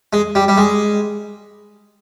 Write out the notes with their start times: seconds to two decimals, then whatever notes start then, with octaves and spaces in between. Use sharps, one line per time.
0.13 G#3
0.35 G3
0.48 G3
0.57 G#3